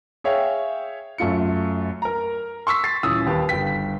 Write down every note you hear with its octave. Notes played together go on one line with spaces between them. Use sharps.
G#4 C#5 E5 F5 G5
F#2 A3 F4 C#7
A#4 A#5
C6 C#6 E6 B6
A6 C7
D#1 E3 C#4 D#6 E6
D#2 G4 B4 A5
G1 G5 B6